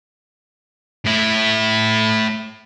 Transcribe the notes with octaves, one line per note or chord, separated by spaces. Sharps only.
A2 E4